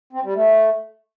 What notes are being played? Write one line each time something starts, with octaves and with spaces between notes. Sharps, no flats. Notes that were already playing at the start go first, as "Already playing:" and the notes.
C4
G3
A3